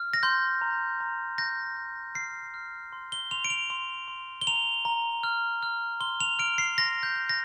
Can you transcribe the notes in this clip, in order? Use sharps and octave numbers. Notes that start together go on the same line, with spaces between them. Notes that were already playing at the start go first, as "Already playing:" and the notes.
Already playing: F6
A#6
C6 G6
A#5
A#5
G6 A#6
G6
F6 C7
F6
C6
G7
C6 F7
D7
F7
C6
C6
G7
A#5 F7
A#5
F6
F6
C6 G7
F7
F6 D7
C7
C6 A#6
G6
G6
A#6